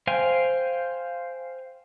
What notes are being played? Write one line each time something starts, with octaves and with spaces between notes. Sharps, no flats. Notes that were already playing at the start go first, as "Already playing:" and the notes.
C5 F5 G5 G#5